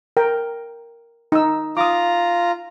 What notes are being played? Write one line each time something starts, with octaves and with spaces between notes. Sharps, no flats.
A#4 G5
D#4 E6
F4 A#5 D6 D#6